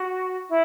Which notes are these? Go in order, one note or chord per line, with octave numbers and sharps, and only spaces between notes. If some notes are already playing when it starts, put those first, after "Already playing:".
Already playing: F#4
E4